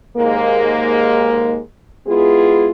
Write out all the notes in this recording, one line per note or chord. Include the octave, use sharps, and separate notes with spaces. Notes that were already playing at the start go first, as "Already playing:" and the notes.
D#2 G#2 G#3 A#3
G#3 B3 E4 F4 G#4